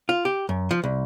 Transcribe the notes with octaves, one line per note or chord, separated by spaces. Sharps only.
F4
G4
F#2
F3
C2